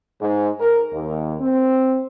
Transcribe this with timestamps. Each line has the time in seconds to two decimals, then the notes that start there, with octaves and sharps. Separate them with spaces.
0.22 G#2
0.61 A#4
0.93 D#2
1.40 C4